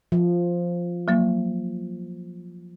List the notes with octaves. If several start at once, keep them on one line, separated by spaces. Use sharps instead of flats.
F3
F#3 A#3